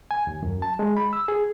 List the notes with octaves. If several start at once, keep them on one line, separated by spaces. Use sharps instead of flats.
G#5
D#2
F#2
A5
G#3
B5
E6
G#4